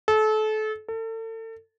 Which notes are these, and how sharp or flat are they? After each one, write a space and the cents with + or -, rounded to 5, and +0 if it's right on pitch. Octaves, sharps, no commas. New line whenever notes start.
A4 -30
A4 +35